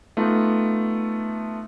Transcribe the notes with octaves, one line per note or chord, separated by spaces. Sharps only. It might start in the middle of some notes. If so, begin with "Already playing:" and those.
A3 B3 D#4 F4